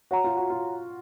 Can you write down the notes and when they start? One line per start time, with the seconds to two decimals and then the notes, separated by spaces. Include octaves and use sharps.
0.11 F#4 C#5 F#5 A#5
0.24 F4
0.37 F#4
0.50 F4